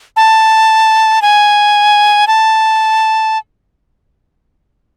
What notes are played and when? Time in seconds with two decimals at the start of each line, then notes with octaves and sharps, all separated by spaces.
0.16 A5
1.22 G#5
2.27 A5